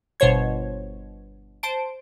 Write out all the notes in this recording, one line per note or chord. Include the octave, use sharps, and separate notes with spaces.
G1 B2 C5 C#5 G#6
C5 A5 D7